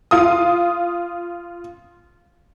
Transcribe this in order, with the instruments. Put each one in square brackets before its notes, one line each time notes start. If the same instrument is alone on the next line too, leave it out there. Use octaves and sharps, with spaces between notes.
[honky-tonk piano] F4 D#6